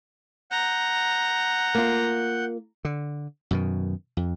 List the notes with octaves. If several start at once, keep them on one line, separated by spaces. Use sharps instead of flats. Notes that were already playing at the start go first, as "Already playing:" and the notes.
F#5 A#5 G6
A#3 F4
D3
F#2 B2 D#3
F2